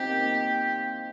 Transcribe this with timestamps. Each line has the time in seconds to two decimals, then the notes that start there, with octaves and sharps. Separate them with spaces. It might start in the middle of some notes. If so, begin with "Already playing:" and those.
Already playing: C4 D#4 F4 G4
0.08 A#3